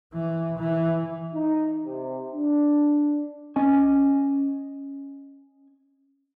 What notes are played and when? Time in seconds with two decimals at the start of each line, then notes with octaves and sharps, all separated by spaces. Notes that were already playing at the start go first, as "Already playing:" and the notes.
0.13 E3
0.58 E3
1.34 D#4
1.85 C3
2.33 D4
3.56 C#4 D#5 G#5